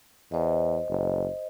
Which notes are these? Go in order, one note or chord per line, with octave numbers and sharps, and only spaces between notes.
E2 C5 D#5
F#1